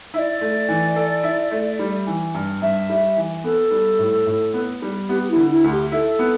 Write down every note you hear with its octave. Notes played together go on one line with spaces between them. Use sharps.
E4 D5 E5
A3
E3
A4
E4
A3
G3
E3
G2
G2 E5
G3
E3
B3 A4
G3
A2
A2
B3
G3
B3 G4
G4
E4
D3
E4
D2
G4
E4 A4
B3